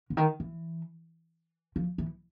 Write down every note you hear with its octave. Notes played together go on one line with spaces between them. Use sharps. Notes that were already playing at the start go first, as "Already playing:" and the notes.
D3
D#3
E3
F3
E3